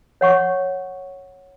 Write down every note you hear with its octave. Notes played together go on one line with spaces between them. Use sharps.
C#5 F#5 C#6